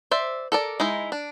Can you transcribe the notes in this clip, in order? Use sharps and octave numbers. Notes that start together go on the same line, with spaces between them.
C5 D5 E5
A4 A#4 D5
G#3 D#4 E4
D4